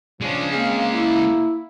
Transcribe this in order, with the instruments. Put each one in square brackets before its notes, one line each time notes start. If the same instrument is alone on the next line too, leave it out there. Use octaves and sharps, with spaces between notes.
[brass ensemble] F3 D4 [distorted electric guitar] G#3 C#4
[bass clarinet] A#3 [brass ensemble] C4 G#4 F5
[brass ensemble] E4